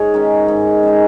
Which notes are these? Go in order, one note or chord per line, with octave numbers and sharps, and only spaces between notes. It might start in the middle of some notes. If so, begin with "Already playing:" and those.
Already playing: G#2 G#4 C#5
D#3 G#3 C#4
G#2
D#3 G#3 C#4